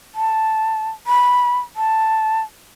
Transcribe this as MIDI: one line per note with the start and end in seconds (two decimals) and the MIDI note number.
0.15 0.90 81
1.07 1.58 83
1.76 2.42 81